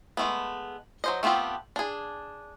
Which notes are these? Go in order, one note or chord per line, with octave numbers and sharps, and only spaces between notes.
G#3 A3 B3
F#3 C5 D#5
A3 B3 C4 F4 G4
D4 G#4